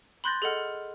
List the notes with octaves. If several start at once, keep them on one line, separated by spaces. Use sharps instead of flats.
B5 C6 F#6 G6 A6 A#6
G#4 A4 D#5 F#5 F6